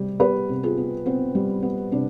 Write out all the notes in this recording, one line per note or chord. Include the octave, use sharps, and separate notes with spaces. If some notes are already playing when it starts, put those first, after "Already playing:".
Already playing: C3 G3 G4
B3 G4 B4
C3
F4 G#4
B3
B3 C4
G3
B3
C3 D4